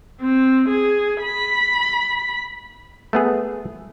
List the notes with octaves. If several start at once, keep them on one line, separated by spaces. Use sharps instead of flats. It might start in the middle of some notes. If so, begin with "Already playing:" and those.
C4
G#4
B5
A3 B3 G#4